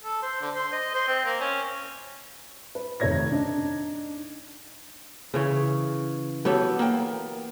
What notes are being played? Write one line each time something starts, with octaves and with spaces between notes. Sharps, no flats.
A4
C5
D3
C5
D#5
C5
C4
A#3
C#4
B4
F1 D#3 C#5 G#6 A#6
D4 D#4
C#3 E3 C#5
F#3 B3 G4 A4 C#5
A#3 G5